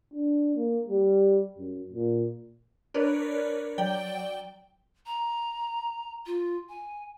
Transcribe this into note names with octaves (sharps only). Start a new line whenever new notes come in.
D4
A#3
G3
F#2
A#2
D4 A#4 B4 C#5 D5
F#3 D5 G5 G7
A#5
F4
G#5